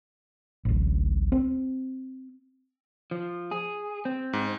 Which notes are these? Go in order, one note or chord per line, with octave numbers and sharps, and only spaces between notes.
D1 A1
C4
F3
G#4
C4
G#2